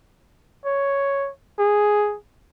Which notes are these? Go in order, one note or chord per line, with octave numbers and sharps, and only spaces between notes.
C#5
G#4